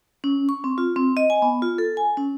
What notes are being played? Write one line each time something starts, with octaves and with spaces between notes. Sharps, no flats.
C#4
C#6
C4
F4
C4
D#5
G#5
B3
F4
A4
G#5
C#4